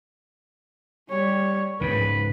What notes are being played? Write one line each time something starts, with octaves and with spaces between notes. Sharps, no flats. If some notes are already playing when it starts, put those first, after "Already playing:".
G3 C#5
G#2 C#3 B4